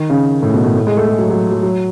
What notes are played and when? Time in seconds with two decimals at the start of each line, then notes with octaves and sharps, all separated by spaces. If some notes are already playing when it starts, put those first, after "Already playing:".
Already playing: D#3
0.10 C#3
0.43 A2
0.54 B2
0.64 A2
0.75 A2
0.87 G#3
0.97 A3
1.08 G#3
1.18 F#3
1.30 F#3
1.52 F#3
1.63 F#3